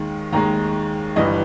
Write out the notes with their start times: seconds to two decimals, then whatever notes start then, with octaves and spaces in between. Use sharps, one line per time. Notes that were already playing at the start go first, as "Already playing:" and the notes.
Already playing: D#2 D#3 G#3
0.33 D#2 D#3 G#3 A#5
1.16 G1 G2 E3 G3 D#5